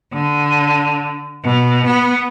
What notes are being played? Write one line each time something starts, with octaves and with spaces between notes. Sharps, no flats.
D3
B2
B3